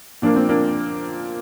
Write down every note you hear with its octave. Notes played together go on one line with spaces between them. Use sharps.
A#2 F3 A#3 D4
C4
A#3 D4